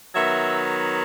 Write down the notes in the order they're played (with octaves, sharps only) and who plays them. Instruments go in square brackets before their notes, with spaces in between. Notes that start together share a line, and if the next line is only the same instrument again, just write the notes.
[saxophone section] D#3 F#3 B3 E5